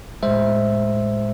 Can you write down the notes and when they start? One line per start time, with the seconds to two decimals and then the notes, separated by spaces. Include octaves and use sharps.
0.23 A2 G#3 C5 E5